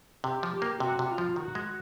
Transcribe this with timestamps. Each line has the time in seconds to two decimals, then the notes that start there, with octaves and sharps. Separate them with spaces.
0.24 C3 G4
0.43 F3
0.52 G4
0.62 A#3
0.80 C3 F#4
0.99 C3
1.08 F4
1.18 F3
1.36 D#3 F#4
1.55 G#3